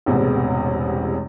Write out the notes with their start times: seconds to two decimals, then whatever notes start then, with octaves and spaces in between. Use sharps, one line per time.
0.06 E1 A1 E2 C3 B3 G#4